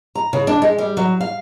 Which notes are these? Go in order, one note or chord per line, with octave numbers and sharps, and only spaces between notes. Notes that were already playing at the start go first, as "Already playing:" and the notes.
A#5
C#3
D4
G#3
G3
F#3
F5